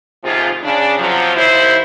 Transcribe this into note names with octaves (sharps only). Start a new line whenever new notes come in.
D#2 G#2 C3 F3 F4 G#4
C#3 D4
C3 F3 F#3
D#2 E4 C5